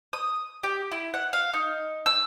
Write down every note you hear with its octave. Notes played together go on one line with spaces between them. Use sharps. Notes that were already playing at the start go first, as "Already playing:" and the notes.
D#6
G4
E4
F#5
F5
D#4
E6